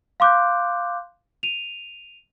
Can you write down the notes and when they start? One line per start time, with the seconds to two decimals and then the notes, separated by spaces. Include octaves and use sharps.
0.20 F5 C6 D6 F#6 G6
1.43 D#7 F7